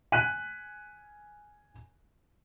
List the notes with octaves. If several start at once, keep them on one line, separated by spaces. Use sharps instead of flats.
G#5 F#6 B6 D#7